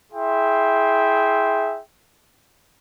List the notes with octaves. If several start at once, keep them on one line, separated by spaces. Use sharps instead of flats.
E4 G#4 E5 G5 C6